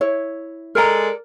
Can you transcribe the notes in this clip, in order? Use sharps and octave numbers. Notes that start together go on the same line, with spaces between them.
E4 C#5
G#3 A4 A#4 D5 A#5